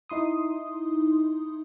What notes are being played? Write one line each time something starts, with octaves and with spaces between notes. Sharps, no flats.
D#4 E4 C6 D#6